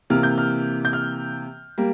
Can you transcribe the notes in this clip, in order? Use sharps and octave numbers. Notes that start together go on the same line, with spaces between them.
C3 E3 A#3 F6
G6
F6
G6
F6
G3 A#3